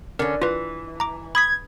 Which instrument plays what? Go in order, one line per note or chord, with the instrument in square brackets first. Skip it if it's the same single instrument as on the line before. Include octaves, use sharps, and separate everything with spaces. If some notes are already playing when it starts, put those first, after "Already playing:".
[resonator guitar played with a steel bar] D3 C#4 [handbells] A#4
[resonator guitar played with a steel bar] E3 [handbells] F4 B4
[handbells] A#5 D6
[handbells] B5 D#6 B6 [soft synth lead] G#6